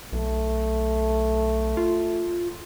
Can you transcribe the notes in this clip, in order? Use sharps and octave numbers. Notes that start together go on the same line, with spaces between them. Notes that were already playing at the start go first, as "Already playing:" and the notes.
B1 A3
F4